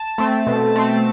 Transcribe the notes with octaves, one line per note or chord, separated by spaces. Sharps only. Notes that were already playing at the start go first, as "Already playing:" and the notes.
Already playing: A5
A3 C4
B2
A3 C4